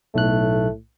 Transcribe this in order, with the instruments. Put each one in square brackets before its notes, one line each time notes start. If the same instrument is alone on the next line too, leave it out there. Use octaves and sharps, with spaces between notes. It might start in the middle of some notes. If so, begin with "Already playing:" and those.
[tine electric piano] B1 F#6 [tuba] A2 [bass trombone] A3